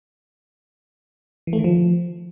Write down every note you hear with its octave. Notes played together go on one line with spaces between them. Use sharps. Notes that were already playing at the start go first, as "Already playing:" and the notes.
E3
A3
D#3
F3